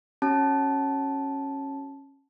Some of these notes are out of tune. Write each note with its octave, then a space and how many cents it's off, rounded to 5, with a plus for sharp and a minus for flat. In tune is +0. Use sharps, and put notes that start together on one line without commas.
C#4 -15 F#4 +15 A5 -10